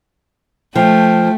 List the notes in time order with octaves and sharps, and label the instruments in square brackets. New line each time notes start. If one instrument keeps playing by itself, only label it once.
[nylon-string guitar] F3 [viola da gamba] A3 [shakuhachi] G5